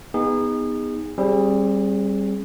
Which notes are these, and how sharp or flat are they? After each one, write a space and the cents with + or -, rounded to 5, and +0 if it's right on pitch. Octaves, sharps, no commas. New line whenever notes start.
B3 +0 D#4 +0 G#4 -30
G3 +5 C4 +40 G#4 +0